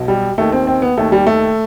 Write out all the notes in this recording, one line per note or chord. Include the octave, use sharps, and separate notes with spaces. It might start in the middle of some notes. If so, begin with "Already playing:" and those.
Already playing: B1 B2
G3
D#2 D#3 A3
C4
C4
B3
D#2 D#3 A3
G3
A3